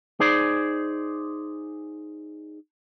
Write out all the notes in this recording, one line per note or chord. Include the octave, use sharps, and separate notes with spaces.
D#4 G#4 C5 D5